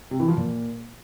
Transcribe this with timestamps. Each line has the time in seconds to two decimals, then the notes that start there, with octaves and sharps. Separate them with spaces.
0.11 C3
0.20 E3
0.28 F3
0.37 A#2